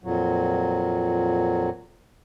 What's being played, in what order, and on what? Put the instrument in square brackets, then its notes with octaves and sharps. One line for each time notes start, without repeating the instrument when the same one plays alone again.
[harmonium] F2 A#2 F#3